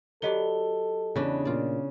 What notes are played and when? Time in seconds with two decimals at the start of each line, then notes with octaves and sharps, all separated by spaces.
0.22 F#3 G4 A4 B4 D5 D#5 G7
1.16 E2 C#3 D4 B4
1.45 A#2 F4 D5